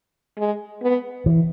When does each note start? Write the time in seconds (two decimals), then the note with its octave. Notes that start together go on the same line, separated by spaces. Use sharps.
0.38 G#3
0.82 B3
1.26 E3